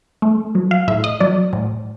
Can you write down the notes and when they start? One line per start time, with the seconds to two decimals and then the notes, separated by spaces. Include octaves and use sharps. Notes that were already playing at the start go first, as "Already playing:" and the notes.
0.22 A3
0.55 F#3
0.71 F5
0.88 A2 E5
1.04 D#5
1.20 F#3 D5
1.53 A2